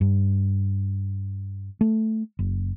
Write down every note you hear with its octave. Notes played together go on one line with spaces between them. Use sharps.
G2
A3
F#1